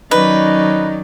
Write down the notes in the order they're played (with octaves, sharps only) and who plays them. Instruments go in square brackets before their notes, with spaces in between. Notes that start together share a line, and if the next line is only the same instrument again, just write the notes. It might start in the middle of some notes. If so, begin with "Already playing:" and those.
[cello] D#3 F#3 [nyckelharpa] C#4 D5 [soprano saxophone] D#4 [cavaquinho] B4